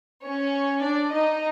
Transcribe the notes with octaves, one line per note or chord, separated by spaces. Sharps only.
C#4 C#5
D4 D5
D#4 D#5